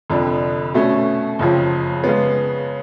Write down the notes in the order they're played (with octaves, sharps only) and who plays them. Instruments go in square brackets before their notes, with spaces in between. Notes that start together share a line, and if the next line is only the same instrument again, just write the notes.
[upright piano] F1 F2 D3
B2 A3 C#4
F#1 F2 C#3 F3
C#3 G#3 B3